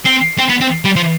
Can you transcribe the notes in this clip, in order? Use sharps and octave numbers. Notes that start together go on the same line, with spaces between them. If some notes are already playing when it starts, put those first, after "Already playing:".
C4
C4
B3
C4
G3
F3